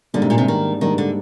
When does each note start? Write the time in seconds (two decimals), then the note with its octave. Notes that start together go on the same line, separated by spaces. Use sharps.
0.14 G#2 D3 G3 A#3 D4
0.22 C3
0.30 A#2
0.38 C3
0.48 D#3
0.81 G#2 D#3 G3 A#3 D4
0.98 D3